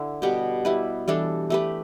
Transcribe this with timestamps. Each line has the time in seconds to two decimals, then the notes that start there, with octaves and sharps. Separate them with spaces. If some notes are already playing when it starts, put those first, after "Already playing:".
Already playing: D3 E4
0.22 B2 G3 B3 G4
0.65 G3 E4 B4
1.08 E3 G3 D4 A4
1.50 A3 G4 B4